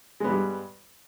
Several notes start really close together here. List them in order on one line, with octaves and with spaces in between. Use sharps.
G#3 B3 G2 G3